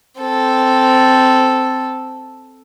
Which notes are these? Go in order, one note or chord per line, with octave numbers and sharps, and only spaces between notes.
C4 A4